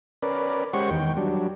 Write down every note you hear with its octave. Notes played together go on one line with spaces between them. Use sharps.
C#4 A#4 B4 D5
G#3 C#4 G4 C5 F#5 C#6
E2 D#3 G5
F#3 G3 D4